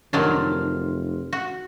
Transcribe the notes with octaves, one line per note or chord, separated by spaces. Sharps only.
F1 D#3 F#3 D4 C6 F6 A#6
F#4